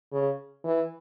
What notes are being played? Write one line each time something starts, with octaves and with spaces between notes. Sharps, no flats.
C#3
E3